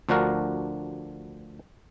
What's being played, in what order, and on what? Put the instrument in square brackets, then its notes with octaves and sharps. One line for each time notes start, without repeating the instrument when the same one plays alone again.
[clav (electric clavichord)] D2 F3 D4 F#4 A#4